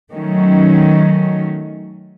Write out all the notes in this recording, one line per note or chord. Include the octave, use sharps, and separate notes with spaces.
D#3 F#3 A3 C#4